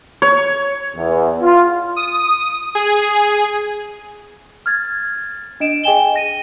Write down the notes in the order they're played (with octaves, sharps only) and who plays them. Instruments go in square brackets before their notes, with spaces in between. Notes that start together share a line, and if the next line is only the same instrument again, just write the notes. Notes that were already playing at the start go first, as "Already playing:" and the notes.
[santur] C#5
[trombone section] E2
F4
[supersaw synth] D#6
G#4
[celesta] F6 G#6 A6
D4 D#5 D7 E7
G#4 D#5 G5 G#5 E7 G7
A#6 D#7